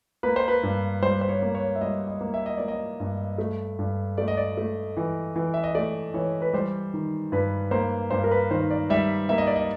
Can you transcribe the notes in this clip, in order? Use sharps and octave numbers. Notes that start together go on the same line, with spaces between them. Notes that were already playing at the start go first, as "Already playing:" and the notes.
A#3 B4
C5
B4
G2
G3 C5
C5
C#5
A#3
C#5
E5
G3 D#5
D#5
A#3
E5
D#5
A#3 D5
D#5
G2
A3
G2
A3 D5
D#5
D5
A3
E3
E3
E5
D#5
A3 D5
E3 C#5
B4
G3 C5
D#3
G2 B4
A#3 C5
G2 C5
A#4
B4
D#3 C5
D5
G3 E5
A#3 E5
D#5
D5
D#5